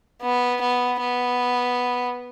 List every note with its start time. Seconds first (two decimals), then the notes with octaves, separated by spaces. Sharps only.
0.22 B3
0.61 B3
1.01 B3